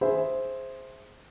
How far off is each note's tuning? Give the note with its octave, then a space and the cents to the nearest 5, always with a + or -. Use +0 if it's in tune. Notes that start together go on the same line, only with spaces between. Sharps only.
G#4 +0 C5 +0 E5 +0